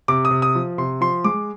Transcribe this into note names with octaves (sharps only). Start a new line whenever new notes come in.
C3 D6
D#6
C3
D#6
F3
C3 C6
F3 C6
G#3 D6